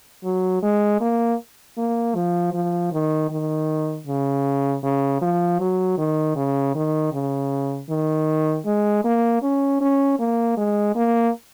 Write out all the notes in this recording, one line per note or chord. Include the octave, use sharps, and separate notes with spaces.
F#3
G#3
A#3
A#3
F3
F3
D#3
D#3
C#3
C#3
F3
F#3
D#3
C#3
D#3
C#3
D#3
G#3
A#3
C#4
C#4
A#3
G#3
A#3